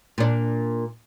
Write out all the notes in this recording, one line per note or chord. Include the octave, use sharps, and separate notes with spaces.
A#2 D4